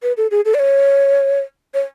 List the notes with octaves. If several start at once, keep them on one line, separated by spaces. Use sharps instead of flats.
B4
A4
G#4
A4
D5
C#5
C#5